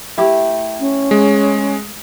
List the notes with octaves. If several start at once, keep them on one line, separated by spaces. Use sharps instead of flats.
A3 E4 G4
C#4
G#3